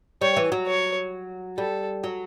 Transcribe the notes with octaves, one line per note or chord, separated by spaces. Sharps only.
G3 C#5
E3
F#3
C#5
G3 A4
F#3